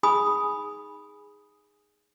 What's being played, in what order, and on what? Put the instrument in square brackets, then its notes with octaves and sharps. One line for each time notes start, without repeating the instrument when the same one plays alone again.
[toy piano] D#4 G#4 G#5 B5 D#6